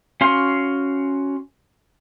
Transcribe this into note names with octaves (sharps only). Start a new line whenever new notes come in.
C#4 F#4 F5 C6